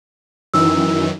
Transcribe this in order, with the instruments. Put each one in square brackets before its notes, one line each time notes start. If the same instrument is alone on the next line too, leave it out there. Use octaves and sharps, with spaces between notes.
[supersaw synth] F#2 D#3 E3 [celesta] E6